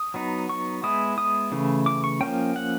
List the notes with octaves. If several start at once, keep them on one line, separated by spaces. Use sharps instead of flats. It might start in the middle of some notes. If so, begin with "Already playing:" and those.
Already playing: D#6
F#3 B3 D#4
C#6
G#3 B3 E4 D#6
D#6
C#3 E3 A3
D6
C#6
F3 A#3 C#4 G5
F#5